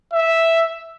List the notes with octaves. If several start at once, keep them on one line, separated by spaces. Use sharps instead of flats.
E5